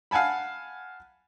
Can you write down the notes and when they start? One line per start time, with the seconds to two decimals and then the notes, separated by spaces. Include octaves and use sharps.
0.11 F5 F#5 G#5 A5 B5